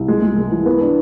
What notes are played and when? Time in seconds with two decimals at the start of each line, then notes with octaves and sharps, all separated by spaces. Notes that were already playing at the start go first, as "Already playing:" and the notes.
Already playing: C2
0.08 G#3
0.22 G#3
0.37 G#3
0.52 E3
0.66 B3
0.80 D4